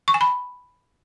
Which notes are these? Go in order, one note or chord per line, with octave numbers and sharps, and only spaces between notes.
C#6
G#5
B5